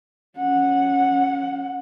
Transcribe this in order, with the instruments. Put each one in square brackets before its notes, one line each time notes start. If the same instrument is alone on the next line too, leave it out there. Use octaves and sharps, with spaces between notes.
[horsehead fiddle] C#4 F#5